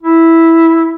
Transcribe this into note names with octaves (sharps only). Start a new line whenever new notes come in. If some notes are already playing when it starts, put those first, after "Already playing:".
E4